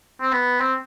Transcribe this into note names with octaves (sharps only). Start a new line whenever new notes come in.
C4
B3
C4